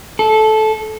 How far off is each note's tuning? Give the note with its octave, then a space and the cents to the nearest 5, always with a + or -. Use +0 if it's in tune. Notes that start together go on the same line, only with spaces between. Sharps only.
A4 -15